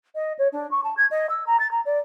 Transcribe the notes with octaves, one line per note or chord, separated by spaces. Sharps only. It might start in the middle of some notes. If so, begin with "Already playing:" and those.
D#5
C#5
D4
C#6
A5
G#6
D#5
E6
A#5
A6
A#5
D5